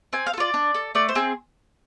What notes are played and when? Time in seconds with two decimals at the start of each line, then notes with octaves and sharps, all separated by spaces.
0.13 C4 G#5
0.26 F5
0.33 A4
0.37 F4 D5
0.54 D4
0.74 A4
0.95 A3 D5
1.09 C5
1.15 C4 G#4